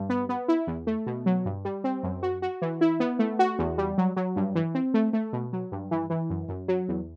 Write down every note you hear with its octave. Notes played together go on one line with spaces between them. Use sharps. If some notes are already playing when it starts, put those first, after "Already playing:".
Already playing: G2
B3
B3
E4
E2
A3
B2
F#3
G2
G3
C4
F#2
F#4
F#4
E3
E4
B3
A3
F#4
E2
G3
F#3
F#3
G2
E3
C4
A3
A3
B2
F#3
G2
E3
E3
F#2
F#2
F#3
E2